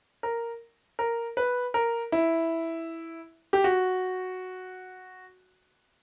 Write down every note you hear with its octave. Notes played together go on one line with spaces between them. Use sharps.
A#4
A#4
B4
A#4
E4
G4
F#4